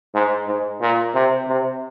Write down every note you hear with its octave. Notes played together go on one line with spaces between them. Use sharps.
G#2
G#2
A#2
C3
C3